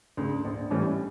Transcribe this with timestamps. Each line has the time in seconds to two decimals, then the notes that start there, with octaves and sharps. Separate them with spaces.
0.17 D2 C#3
0.44 A#1
0.70 A2 E3 G3 C#4